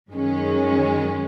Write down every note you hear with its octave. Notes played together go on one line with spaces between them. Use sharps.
F#2 D#3 G#3 C#4